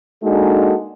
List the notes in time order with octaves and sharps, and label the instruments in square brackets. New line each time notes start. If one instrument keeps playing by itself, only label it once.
[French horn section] G#3 A#3 D4 D#4 F#4 A4